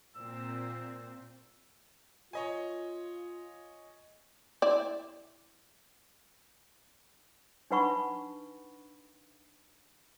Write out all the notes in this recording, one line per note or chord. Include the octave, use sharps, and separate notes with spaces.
A#2 C4 E6
F4 C#5 D#5 G#5
E4 D5
D4 D#4 B4 F#5 B5 C#6